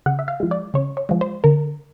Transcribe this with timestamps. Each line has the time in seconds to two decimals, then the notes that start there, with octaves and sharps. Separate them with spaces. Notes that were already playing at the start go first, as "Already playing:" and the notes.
0.06 C#3 F#5
0.19 E5
0.28 F5
0.40 F3 G#3
0.51 D5
0.74 C#3 C#5
0.97 C#5
1.09 F3 G#3
1.21 C5
1.44 D3 A#4